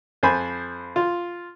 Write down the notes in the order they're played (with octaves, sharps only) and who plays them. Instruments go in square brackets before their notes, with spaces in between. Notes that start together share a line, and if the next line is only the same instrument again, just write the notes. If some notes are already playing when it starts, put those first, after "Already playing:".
[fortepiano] F2 C5 G#5 B5
F4